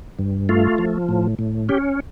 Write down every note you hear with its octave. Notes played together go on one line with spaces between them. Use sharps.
G2
A3 F4
F3
A2
A2
C#4 G4